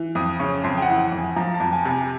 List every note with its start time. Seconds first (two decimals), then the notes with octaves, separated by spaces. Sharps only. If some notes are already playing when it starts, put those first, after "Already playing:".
Already playing: E3
0.15 F2 D#6
0.39 C#3 C#6
0.64 F2 C6
0.78 G5
0.82 F#5
0.88 E3
1.12 F2
1.18 G#5
1.36 F3 A#5
1.54 A5
1.60 F2
1.73 G#5
1.85 C3
1.90 G#5